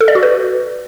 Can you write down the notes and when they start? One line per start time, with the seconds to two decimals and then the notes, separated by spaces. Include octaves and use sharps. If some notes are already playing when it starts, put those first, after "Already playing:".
0.01 A4
0.08 D5
0.15 F#4
0.23 B4